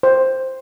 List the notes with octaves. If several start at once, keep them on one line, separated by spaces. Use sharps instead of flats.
C5